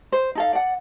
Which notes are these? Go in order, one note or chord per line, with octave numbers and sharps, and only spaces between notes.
C5
D#4 A4 F5
D5 F#5